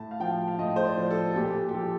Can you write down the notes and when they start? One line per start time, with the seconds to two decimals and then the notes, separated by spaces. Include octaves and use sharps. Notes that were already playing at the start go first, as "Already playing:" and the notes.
Already playing: A2 A5
0.11 F5
0.20 F3 G5
0.48 F5
0.59 A2 D#5
0.76 C5
0.85 D5
0.97 F3
1.11 A4
1.31 A4
1.36 A#2 G4
1.69 G4
1.74 F3 A4